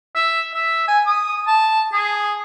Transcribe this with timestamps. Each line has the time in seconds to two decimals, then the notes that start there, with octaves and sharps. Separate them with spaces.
0.15 E5
0.54 E5
0.88 G#5
1.06 D#6
1.47 A5
1.93 G#4